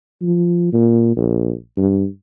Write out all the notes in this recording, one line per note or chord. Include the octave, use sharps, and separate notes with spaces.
F3
A#2
A#1
G2